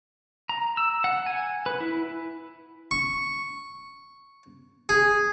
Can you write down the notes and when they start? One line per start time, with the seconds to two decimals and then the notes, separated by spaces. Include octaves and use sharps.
0.49 A#5
0.77 E6
1.04 F#5
1.26 G#5
1.66 B4
1.80 E4
2.91 C#6
4.89 G#4